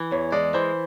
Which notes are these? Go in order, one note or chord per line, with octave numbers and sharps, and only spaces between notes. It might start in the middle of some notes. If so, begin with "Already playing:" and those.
Already playing: E3
E2 C#5
G#3 D5
E3 C5